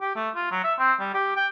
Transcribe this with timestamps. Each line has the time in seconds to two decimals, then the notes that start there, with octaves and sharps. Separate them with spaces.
0.01 G4
0.15 A3
0.35 F4
0.51 F#3
0.64 E5
0.79 C4
1.00 G3
1.14 G4
1.36 G5